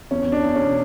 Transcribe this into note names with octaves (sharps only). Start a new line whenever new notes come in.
E2 C#4
E2
D4
E2
C#4
B2